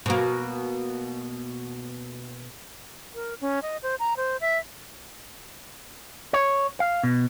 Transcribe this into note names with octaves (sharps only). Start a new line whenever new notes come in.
B2 A#3
A#4
C#4
D#5
C5
A#5
C5
E5
C#5
F5
B2